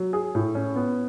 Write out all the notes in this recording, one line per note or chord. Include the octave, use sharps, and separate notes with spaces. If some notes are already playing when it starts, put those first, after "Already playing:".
Already playing: F#3
G#4
A2
C#4
B3